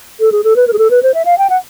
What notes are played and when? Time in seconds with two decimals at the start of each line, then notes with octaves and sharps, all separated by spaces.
0.20 A4
0.32 G#4
0.44 A4
0.56 B4
0.67 A#4
0.73 G#4
0.78 A4
0.90 B4
1.03 C5
1.14 E5
1.25 F5
1.38 G5
1.50 F#5